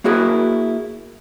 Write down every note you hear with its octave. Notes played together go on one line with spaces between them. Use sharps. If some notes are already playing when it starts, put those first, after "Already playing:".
A#3 E4 F#4 G#4 A#4